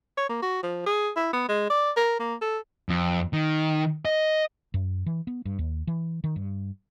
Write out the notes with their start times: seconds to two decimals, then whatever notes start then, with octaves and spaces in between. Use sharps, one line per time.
0.17 C#5
0.29 A#3
0.42 F#4
0.63 F3
0.86 G#4
1.16 E4
1.33 B3
1.48 G#3
1.70 D5
1.96 A#4
2.20 A#3
2.41 A4
2.89 F2
3.33 D#3
4.05 D#5
4.74 F#2
5.06 E3
5.27 B3
5.45 G2
5.59 D#2
5.87 E3
6.24 D#3
6.36 G2